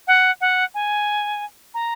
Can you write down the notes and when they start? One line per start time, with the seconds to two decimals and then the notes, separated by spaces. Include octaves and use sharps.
0.07 F#5
0.41 F#5
0.74 G#5
1.74 A#5